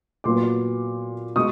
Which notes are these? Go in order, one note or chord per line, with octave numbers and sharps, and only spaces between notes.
A#2 F#3 B3 C6 D6
B2 G#3 C#6 D#6